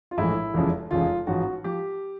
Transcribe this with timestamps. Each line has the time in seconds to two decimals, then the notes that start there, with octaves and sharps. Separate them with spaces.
0.11 F4
0.17 A#1 A2 E3 G#3 E4
0.54 F1 E2 C#3 F3 G#3
0.91 F1 E2 C#3 F3 G#3 F4
1.27 A1 G#2 F3 F#4
1.64 F3 G4